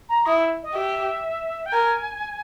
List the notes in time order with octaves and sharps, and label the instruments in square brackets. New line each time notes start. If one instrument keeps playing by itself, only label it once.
[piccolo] A#5
[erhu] E4 [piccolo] D#6
[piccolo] E5
D#5
[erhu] G4 [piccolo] E5
[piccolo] G5
[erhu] A#4 [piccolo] G#5